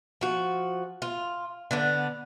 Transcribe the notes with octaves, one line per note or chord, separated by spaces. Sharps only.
F3 F#4
F4
D3 B3 D4